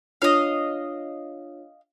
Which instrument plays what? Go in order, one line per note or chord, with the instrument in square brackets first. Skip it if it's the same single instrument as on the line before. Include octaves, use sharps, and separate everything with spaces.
[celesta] D4 F4 C#5 [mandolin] D#5 F5